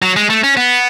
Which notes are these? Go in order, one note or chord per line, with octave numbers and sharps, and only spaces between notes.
F#3
G#3
A3
C#4
B3